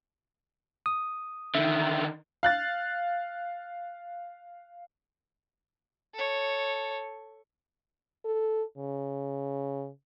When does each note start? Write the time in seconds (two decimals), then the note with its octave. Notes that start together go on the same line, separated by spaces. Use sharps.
0.86 D#6
1.55 D3 D#3 E5
2.43 F5 F#6 A6
6.14 A4 C#5
8.25 A4
8.77 C#3